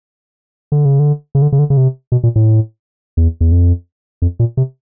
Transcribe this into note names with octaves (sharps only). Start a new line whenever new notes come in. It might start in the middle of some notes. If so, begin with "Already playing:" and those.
D3
C#3
D3
C#3
D3
C#3
D3
C#3
C3
B2
A#2
A2
E2
E2
F2
F2
A#2
C3